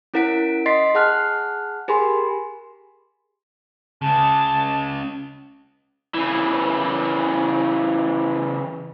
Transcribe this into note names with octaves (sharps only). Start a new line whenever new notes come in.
C#4 E4 A#4 F#5 B6 D7
D#5 C6 A6 B6 C7
G#4 F#5 A5 F6 F#6
G4 G#4 A#4 G#5 B5 C6
C#2 C#3 A5
C#3 E3